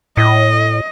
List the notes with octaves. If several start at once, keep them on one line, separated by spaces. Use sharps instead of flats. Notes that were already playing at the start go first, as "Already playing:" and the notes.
A2 D#5